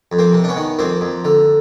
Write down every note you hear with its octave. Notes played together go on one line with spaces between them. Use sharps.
F2
A#3 C4
C3
D4
B3 C#4
D#3
F2 A#3 C4
F2
D3